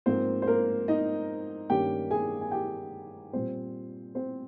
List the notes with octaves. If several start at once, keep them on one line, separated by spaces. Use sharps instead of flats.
G#2 F3 A#3 C4 C5
C5
A#3 A#4
D#4 D#5
G2 D#3 A#3 C#4 G4 G5
G#4 G#5
G#5
G4 G5
A#2 G3 C4 C5
C4 C5